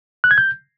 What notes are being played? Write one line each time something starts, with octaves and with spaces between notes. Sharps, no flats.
F#6
G#6
G6